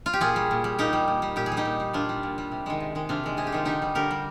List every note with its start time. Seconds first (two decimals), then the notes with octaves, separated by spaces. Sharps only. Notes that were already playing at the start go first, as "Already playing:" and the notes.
0.06 F4
0.13 G4
0.21 A#2 F4 G#4
0.36 G3
0.51 A#2
0.64 G3
0.79 A#2 D#4 G4
0.93 G3
1.08 A#2
1.22 G3
1.36 A#2 G4
1.46 G#4
1.52 G3
1.57 D#4 G4
1.65 A#2
1.80 G3
1.93 A#2 D4 F4
2.09 G3
2.23 A#2
2.38 G3
2.52 C3
2.66 D#3 G#3
2.80 C3
2.95 D#3 G#3
3.09 C3 D4 F4
3.24 D#3 G#3
3.37 C3 G#4
3.47 G4
3.52 D#3 G#3 F4
3.65 D3 D#4 G4
3.82 G3
3.95 D3 G4 A#4
4.11 G3